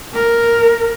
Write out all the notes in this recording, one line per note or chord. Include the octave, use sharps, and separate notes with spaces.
A#4